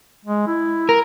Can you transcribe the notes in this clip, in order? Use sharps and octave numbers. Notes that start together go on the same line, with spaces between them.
G#3
E4
A#4